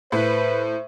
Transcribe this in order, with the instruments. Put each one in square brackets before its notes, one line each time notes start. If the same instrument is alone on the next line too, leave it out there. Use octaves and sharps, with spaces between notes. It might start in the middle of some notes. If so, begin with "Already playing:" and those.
[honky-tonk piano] A2 [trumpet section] B4 [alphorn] C5